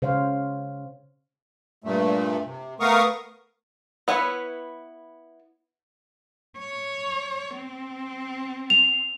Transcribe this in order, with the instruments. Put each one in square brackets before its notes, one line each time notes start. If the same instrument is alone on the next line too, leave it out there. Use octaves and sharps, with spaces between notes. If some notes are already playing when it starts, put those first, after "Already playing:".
[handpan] C#3 C5 C#5 F5
[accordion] G2 A#2 A3
C3
A3 B3 A#4 F5 C#6 D#6
[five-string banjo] B3 E4 B4 C#5
[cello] C#5
C4
[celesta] F7